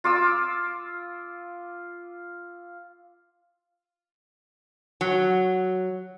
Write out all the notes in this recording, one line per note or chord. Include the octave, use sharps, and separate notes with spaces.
F4 D6 E6
F#3